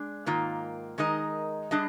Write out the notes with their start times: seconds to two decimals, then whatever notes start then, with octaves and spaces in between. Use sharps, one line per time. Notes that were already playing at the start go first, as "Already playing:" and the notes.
Already playing: G#3 D4
0.26 G#2 D#3 A#3 F4
0.98 D#3 G#3 D#4 A#4 D#5
1.71 G3 D4 G#4 D#5